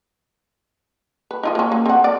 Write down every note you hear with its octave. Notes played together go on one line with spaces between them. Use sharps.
B4
D#4 F4 D#5
A#3 C#4
A#3
C4 F#5
D5